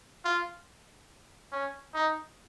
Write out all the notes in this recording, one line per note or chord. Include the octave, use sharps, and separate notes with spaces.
F4
C#4
D#4